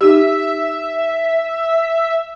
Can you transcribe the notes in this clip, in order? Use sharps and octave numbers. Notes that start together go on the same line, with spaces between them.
D#4 G4 E5